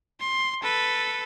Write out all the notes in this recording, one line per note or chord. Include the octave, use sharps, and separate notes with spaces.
C6
A4 B4